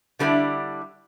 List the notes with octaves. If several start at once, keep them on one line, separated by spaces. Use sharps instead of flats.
D3 G3 B3 D4 E4 D5